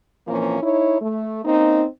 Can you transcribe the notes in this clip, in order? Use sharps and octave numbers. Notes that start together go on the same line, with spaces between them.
A#2 E3 F3 A#3 C4 C#4
D#4 E4 C#5
A3
A#3 C4 C#4 D#4